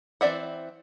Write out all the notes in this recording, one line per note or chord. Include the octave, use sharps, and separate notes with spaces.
E3 C4 D5 E5 F#5